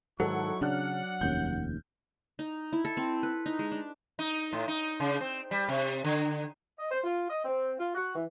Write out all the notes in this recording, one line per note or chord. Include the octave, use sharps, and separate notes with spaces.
G#2 D#3 F#3 D#4 E4 A4 F#5 C#6
C#3 D4 F#5 F6 F#6
F1 D#2 C#4 G6
D#4
E4
A4
C4
B4
D#4
G#3
D4
D#4
A2
D#4
C#3
C4
G3
C3
D3
D#5
C5
F4
D#5
C4
F4
F#4
E3